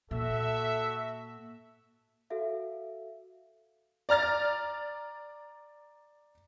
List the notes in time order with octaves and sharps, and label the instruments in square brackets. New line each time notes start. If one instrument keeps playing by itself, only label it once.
[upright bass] A#2 [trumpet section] F#4 E5 [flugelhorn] A4
[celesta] F#4 A4 E5 F5
[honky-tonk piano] D5 A#5 F6 A6